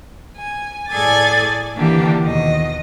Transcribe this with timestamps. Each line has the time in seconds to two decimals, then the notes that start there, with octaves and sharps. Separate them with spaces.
0.37 G#5
0.90 A2 G#4 A4 D5 G#5 A6
1.75 D3 E3 A#3 D4 G4
2.23 D#2 B2 D#5